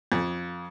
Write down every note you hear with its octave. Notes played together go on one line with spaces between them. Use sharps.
F2